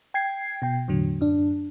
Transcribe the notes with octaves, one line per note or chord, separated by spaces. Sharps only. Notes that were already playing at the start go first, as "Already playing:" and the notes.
G5 G#6 C7
B2 G5
E2 A2 D3 F#3
F#2 D4